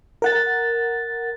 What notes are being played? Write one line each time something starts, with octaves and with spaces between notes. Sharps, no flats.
A#4 F#5 A6